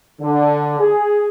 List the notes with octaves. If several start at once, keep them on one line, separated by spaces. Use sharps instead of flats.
D3
G#4